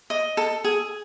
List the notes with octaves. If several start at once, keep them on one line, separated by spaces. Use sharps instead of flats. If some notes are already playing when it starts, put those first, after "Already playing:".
D#5
A4
G#4